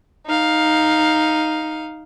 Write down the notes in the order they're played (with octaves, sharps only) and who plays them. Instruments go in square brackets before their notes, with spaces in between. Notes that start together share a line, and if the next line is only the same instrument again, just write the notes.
[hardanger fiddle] D#4 F5